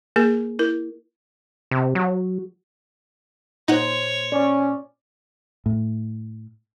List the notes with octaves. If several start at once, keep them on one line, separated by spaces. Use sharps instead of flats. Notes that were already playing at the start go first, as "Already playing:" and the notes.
A#3 G#4 A#4
E4 A#4
C3
F#3
A#2 D#4 C5 C#5 F#5
C#4 D5
A2